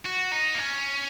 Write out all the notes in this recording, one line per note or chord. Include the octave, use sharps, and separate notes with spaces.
F#4
D#4
A#3
C#4